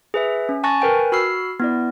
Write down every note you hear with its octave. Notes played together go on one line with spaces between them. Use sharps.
G#4 B4 E5
C#4
G#5 A5 C#6 F#6 A6 A#6
A#4 B4 G5 G#5
F#4 B5 E6 F6 C7
B3 E4 D5